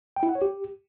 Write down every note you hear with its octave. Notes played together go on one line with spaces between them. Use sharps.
G5
E4
F#5
C#5
G4